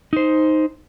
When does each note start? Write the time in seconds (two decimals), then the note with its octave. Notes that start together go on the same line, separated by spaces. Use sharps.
0.13 D#4 C5